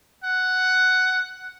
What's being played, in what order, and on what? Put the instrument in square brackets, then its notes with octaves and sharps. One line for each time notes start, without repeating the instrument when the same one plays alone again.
[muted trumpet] F#5